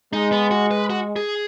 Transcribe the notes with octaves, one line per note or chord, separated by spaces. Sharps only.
G#3 D#4
B3
F#4
B4
F#4
G#4